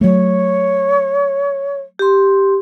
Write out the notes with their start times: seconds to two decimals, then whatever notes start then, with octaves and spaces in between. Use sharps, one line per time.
0.01 F#3 A3 C#5
1.99 G4 C6